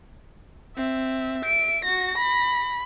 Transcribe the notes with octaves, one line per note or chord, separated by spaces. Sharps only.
C4 E5
D7
F#4 A#6
B5